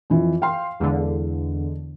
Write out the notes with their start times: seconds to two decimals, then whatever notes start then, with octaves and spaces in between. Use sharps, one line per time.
0.10 F2 E3
0.42 F5 G5 C6
0.80 E2 D3 G#3